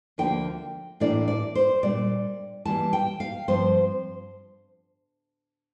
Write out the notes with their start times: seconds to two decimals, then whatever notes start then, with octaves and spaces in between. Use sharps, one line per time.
0.18 D2 D3 F3 A#3 D4 G5
1.00 A2 E3 A#3 D4 D5
1.28 D5
1.55 C5
1.83 A#2 G3 D4 D5
2.65 A2 E3 G3 A#3 A5
2.93 G5
3.20 F5
3.48 G2 F3 C4 C5